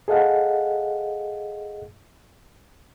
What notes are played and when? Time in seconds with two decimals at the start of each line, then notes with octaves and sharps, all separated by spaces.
0.08 G#4 A4 D#5 F5 F#5